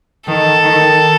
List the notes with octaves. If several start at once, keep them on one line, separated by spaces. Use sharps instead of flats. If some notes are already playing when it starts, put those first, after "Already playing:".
D#3 A4
D#3